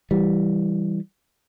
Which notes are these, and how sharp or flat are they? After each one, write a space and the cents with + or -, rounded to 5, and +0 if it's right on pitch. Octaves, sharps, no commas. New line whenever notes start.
E3 +0 G3 +0